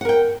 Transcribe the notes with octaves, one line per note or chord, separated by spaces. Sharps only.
A#4 F#5 G5